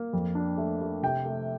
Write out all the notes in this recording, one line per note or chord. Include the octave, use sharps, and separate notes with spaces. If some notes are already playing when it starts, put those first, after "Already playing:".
Already playing: A#3
F2
D4
A3
A3
C3 G5
A3